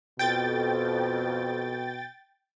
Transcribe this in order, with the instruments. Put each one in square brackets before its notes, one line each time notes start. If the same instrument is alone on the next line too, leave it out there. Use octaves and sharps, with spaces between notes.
[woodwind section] F2 [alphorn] B2 [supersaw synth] G5 A6